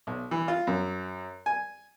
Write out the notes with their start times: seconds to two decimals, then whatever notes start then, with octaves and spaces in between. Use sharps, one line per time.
0.07 B1
0.31 E3
0.48 F4
0.67 F#2
1.46 G#5